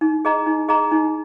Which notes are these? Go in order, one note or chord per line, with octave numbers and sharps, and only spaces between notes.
D#4
G#4 D#5 A#5
D#4
G#4 D#5 A#5
D#4